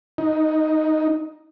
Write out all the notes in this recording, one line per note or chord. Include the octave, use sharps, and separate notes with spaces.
D#4